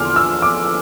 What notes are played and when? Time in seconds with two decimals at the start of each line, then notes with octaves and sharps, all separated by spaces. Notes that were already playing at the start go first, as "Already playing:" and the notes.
Already playing: E2 D3 F3 C6 D6 F6
0.16 E6
0.42 D6